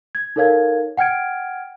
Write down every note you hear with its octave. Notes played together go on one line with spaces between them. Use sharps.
G#6
D#4 A4 A#4 C#5 F5 G#6
F#5 G5 F6 G#6 D7